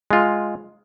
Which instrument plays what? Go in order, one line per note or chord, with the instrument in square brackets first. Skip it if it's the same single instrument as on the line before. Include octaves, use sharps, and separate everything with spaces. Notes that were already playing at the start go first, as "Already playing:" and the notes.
[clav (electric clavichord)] G#3 F4